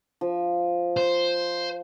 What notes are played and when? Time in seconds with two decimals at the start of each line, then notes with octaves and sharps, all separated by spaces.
0.21 F3
0.97 C5